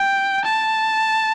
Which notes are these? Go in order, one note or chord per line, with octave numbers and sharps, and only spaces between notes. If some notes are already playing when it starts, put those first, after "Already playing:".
Already playing: G5
A5